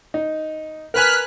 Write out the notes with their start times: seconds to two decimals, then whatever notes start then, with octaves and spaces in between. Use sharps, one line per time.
0.14 D#4
0.94 A#4 B4 G#5 F6 F#6 B6